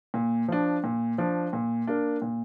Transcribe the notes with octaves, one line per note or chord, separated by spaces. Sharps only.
A#2
F3 D4
A#2
F3 D4
A#2
A#3 D4
A#2